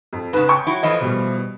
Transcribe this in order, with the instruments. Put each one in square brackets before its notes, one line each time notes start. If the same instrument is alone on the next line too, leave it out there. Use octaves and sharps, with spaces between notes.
[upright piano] F2
[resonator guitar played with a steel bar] G#2 C#3 [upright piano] B4
[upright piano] G5 C#6
[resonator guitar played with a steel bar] F#3 E4
[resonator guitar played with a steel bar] E3 F3 A3 [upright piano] D#5
[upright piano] B2 G3